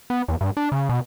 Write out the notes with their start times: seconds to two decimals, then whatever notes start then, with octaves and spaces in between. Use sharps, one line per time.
0.10 B3
0.28 E2
0.41 G2
0.57 D4
0.72 C#3
0.89 B2